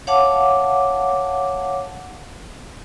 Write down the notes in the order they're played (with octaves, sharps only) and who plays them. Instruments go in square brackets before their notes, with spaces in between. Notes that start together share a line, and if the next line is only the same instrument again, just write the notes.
[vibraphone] C#5 F5 F#5 A5 D6